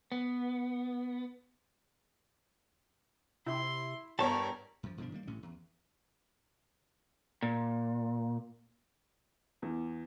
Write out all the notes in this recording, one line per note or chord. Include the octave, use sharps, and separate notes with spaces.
B3
C3 E4 C6
E2 G2 G3 A#4 C#5 A5
F#2 F3
G2 B2 F3 D4
D#3 G3 A#3
A1 A2 C#4
E2
A#2
E2